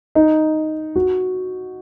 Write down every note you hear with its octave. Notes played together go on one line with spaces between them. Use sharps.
D#4
F#4